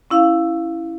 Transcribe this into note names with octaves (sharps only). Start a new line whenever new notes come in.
C#4 E4 F5